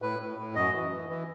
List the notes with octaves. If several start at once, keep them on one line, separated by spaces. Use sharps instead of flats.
A2 B4
A2
A2
F#2 D#5
E3
E3
E3